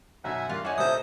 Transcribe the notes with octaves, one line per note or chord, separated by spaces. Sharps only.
B1 F#2 E5 F#5 G#5 B6
G2 A#3 F4 C6 F#6
C#4 D#4 E4 C#5 D5 F#5 G#5
C2 A#2 A4 C5 D#5 D#6